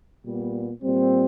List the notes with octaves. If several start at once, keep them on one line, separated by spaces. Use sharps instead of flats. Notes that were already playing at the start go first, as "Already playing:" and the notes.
A#2 G3 B3
A#2 G3 C4